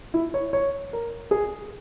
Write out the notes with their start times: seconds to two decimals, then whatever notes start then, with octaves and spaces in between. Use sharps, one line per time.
0.14 E4
0.34 C#5
0.53 C#5
0.93 A#4
1.31 G#4